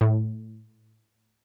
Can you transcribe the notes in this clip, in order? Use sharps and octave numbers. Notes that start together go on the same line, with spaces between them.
A2